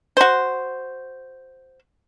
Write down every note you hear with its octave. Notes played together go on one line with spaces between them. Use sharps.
F#4 C5